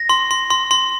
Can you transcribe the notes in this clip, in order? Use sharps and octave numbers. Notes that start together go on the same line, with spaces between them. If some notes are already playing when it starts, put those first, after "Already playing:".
Already playing: A#6
C6
C6
C6
C6